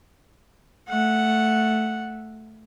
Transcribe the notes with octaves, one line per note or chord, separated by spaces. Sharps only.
A3 F#5